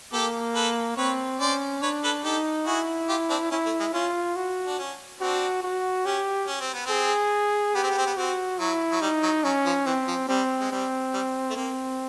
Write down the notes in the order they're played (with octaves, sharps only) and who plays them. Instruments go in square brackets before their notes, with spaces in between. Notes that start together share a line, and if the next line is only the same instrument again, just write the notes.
[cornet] A#3 [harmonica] G4 A4
[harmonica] A4 B4
[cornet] C4 [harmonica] B4 C#5
[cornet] C#4 [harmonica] C5 D5
[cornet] D4 [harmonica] B4 C#5
[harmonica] A4 B4
[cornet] D#4 [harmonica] G4 A4
[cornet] E4 [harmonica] F#4 G#4
[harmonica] F4 G4
C4 D4
[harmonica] C#4 [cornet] E4
[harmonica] A3
G#3
[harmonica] C#4 [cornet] F4
[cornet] F#4
[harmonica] D4
C#4
[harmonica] C4 D4 [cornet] F#4
[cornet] F#4
[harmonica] C#4 [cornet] G4
[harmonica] C#4
C4
B3
[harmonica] C4 [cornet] G#4
[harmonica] B3 [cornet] G4
[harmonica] C4
B3
C4
B3
[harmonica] C4 [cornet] F#4
[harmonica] F#3 [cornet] E4
[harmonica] F#3
[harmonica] G3 [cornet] D#4
[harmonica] F#3
[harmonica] F#3 [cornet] C#4
[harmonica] F3
[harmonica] E3 [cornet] C4
[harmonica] F3
[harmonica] G3 [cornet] C4
[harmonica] G#3
[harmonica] G3 [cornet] C4
[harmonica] G3
A3
[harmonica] A#3 [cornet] C4